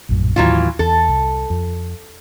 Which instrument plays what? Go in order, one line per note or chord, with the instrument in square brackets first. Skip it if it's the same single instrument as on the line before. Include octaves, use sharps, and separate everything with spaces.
[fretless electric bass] A#1 F#2 A2
[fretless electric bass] D#2 A2 [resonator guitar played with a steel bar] E3 F#3 F4
[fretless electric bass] E2 [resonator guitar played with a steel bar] A4
[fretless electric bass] C2
F2